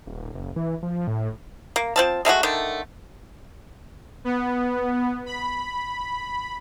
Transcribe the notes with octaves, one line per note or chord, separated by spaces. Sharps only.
D#1
F#1
E3
F3
A2
A#3
F3 C4 A5
G#3 A3 D#4 F#4
D3 D#3 A3
B3
B5